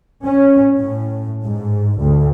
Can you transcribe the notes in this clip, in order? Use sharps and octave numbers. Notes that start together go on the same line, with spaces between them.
C#4
A2
G#2
D2